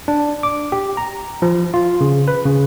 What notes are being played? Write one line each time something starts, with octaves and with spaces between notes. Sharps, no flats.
D4
D6
G4
A#5
F3
F4
C#3
B4
C#3